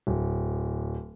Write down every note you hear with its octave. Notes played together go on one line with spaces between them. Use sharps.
D1